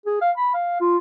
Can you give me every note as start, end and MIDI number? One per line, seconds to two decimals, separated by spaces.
0.06 0.17 68
0.21 0.31 77
0.37 0.51 83
0.54 0.77 77
0.81 0.97 65